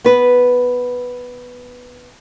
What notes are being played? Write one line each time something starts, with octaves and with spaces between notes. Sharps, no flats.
B3 B4